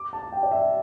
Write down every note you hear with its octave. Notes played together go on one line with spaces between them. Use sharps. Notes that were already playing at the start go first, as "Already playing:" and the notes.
Already playing: D6
A5
G5
D5
E5